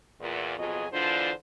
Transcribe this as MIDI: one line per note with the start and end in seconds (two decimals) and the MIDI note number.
0.21 0.55 40
0.21 0.55 46
0.58 0.86 41
0.58 0.86 47
0.58 0.86 54
0.58 0.86 65
0.58 0.86 68
0.58 0.86 75
0.92 1.32 50
0.92 1.32 52
0.92 1.32 56
0.92 1.32 62
0.92 1.32 65
0.92 1.32 72